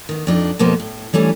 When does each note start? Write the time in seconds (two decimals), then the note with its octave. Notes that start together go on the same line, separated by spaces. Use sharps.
0.09 D#3 B3
0.27 F2 D4 D#4
0.59 F2 B2 A#3 B3 G4 C5
0.80 A2
1.13 E3 G3 A3 C#4 D4